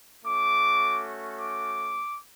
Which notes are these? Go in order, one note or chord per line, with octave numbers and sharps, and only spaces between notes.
A3 C#4 F#4 D6
D6